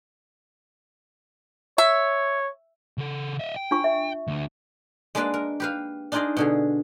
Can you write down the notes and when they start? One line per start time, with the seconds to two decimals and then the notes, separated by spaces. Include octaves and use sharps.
1.78 C#5 E5
2.98 C#3 A4
3.39 D#5 E5
3.56 G5
3.71 D4 F4 C#6
3.84 E5
4.27 D2 D3
5.15 G#3 A#3 D4 B4 D5 A5
5.34 A#4
5.60 G4 B4 F5
6.12 D4 D#4 F4 G#4 D5 D#5
6.37 B2 D3 G#4